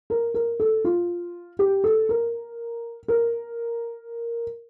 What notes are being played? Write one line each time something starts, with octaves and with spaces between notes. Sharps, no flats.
A#4
A#4
A4
F4
G4
A4
A#4
A#4